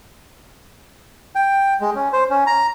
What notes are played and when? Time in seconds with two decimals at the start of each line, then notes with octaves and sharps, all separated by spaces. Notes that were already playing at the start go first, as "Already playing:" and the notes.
1.35 G5
1.81 G#3
1.95 C#4
2.13 C5
2.30 C#4
2.47 A#5